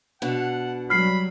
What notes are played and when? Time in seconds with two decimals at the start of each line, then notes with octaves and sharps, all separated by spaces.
0.22 B2 D4 F#5
0.90 F#3 G3 B5 F6 C7